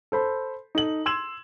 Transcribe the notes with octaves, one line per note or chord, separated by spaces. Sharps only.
A4 C5 B5
D#4 A4 F#7
C6 E6 G#6 E7 F#7